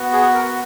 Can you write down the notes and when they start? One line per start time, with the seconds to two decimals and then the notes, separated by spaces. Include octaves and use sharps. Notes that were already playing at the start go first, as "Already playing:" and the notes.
Already playing: B3 F#4
0.13 G#4
0.34 A#4